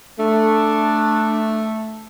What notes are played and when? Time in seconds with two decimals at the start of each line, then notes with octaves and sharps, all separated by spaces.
0.19 A3 D4